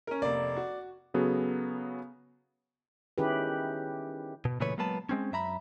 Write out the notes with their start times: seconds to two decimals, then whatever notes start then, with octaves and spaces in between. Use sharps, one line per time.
0.07 C#4 A#4
0.22 F1 A#3 D5
0.57 F#4
1.14 C#3 F#3 B3 F#4 G#4 A4
3.18 D#3 C#4 E4 G4 G#4 B4
4.45 B2
4.60 A#2 C#3 E3 A3 B4 C#5
4.78 F#3 G#3 A#3 B3 B4 A5
5.09 G#3 C4 C#4
5.32 F#2 E5 A#5 B5